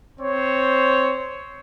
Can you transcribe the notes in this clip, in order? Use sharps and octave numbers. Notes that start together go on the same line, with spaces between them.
C4 C5 C#5